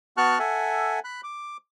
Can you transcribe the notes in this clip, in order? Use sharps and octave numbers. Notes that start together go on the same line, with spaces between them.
B3 F#4 A5 C#6 F6 F#6
A4 E5 F#5 G#5
B5 F#6
D6